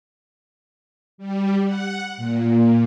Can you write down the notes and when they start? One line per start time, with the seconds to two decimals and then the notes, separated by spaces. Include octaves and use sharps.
1.18 G3
1.65 F#5
2.17 A#2